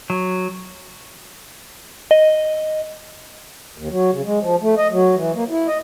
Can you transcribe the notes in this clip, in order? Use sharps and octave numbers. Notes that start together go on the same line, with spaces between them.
F#3
D#5
D#2
F#3
C#3
G#3
F3
A3
D#5
F#3
E3
A#3
E4
D#5